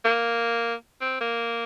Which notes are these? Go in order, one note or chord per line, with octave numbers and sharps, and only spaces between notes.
A#3
C4
A#3